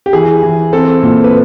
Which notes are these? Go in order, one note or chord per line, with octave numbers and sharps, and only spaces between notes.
G4
E3 G#4
E3
C4 A4
A#2
B4